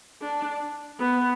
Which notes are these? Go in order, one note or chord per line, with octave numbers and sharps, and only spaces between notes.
D4
B3